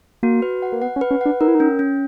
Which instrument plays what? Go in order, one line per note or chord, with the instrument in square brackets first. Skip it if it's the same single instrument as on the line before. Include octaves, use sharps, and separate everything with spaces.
[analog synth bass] A#3 [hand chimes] F#4
[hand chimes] B4
F#5
[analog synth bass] A#3
[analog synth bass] B3 [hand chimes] F#5
[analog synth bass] C#4
[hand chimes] B4
[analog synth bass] C#4
[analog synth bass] D4 [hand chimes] F#5
[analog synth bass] D#4 [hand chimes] A#4
[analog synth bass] E4
D#4
[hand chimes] C#4
C#4